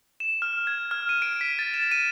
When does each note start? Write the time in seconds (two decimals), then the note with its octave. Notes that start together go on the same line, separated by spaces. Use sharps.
0.20 E7
0.42 F6
0.67 G#6
0.91 F6
1.09 D#7
1.22 D7
1.41 B6
1.59 A6
1.74 E7
1.91 D#7